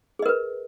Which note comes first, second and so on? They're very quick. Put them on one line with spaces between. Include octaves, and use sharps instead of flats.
G#4 D#5 A#4 B4